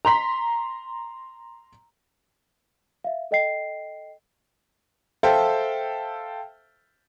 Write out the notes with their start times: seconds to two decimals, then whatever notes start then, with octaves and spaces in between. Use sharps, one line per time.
0.05 A#5 C6 B6
3.04 E5 F5
3.31 A4 D#5 G5 C7
5.23 A4 C5 E5 F5 G5 A5